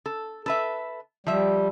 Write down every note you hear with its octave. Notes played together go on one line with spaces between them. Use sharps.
A4
A4 B4 E5
F3 G3 E5